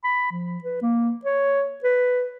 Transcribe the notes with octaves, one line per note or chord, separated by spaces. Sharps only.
B5
F3
B4
A#3
C#5
B4